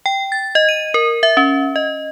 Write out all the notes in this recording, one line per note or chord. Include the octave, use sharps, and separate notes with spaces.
G5
A6
D#5
D#7
A#4
E5
C#4
D#5